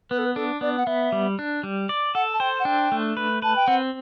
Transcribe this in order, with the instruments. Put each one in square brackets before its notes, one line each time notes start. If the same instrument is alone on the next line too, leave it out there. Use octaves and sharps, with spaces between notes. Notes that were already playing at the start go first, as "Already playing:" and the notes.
[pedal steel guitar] B3 [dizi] B4
[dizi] A4
B4
[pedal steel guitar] D4 [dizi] A4
[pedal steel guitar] B3 [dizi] D5
[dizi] F#5
[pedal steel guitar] B3 [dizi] E5
[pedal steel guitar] G3
D4
G3
D5
[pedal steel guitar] A4 [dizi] F#5
[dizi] A5
[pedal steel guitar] C5 [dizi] G5
[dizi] F#5
[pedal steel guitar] D4 [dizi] G5
[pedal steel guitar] A3
B4
[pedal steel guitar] B4 [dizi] A5
[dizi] G5
[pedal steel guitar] C4 [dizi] F#5